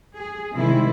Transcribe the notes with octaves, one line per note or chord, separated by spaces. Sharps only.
G#4
C3 D#3 G3 G#3 C4 E4